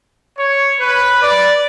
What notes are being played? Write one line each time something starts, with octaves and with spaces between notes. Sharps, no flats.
C#5
B4
D5